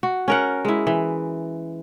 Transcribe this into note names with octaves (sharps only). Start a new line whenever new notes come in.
F#4
C#4 A#4 F#5
G#3 E4
E3